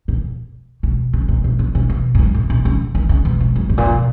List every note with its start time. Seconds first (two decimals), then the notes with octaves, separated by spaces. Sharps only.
0.08 A#2
0.83 B2
1.13 C#3
1.28 A#2
1.44 B2
1.59 B2
1.75 C#3
1.90 B2
2.15 G#2
2.19 F#2
2.34 A#2
2.50 A#2
2.65 C#3
2.95 D#3
3.09 C#3
3.25 B2
3.41 G#2
3.56 F#2
3.69 G#2
3.78 A#2
3.85 B2